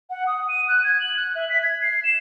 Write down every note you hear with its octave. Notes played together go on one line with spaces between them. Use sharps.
F#5
D#6
D#7
F#6
G#6
F#7
F#6
E5
B6
G#6
C7
E7